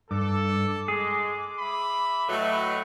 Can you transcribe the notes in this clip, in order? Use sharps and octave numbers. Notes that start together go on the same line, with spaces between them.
G2 A4 D6
G#3 G#4
E5 B5
A2 F#3 A3 B4 D#5